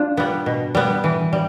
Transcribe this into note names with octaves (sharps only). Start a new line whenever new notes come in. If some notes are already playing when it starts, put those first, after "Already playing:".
Already playing: D4 F4
G3 B3
B2
G3 B3
E3
G3